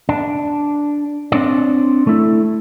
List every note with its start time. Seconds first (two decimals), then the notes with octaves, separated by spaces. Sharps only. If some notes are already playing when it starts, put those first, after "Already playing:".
0.09 D4
1.32 C4 D4 C#5 D5
2.07 A3 E4